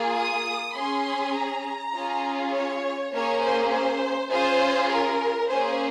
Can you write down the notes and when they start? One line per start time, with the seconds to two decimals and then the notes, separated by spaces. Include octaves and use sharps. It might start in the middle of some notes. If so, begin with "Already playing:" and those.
Already playing: A#3 F4 G#4
0.18 D#6
0.77 C#4 G#4 C6
1.36 A#5
1.96 C#4 F4 G#4
2.53 C#5
3.13 A#3 C#4 G#4 C#5
3.42 C5
3.72 C5
4.31 C#4 F4 G#4 C5
4.90 A#4
5.48 A#3 C#4 G#4 C5